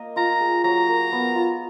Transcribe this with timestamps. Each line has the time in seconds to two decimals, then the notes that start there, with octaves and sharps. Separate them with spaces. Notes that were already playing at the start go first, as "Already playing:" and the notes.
Already playing: A#3 D#5
0.16 F4 A#5
0.41 G#4
0.64 F#3 A#5
0.88 A#4
1.12 B3
1.35 F4